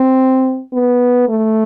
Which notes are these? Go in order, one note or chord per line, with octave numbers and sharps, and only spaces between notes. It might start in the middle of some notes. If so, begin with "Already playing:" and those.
Already playing: C4
B3
A3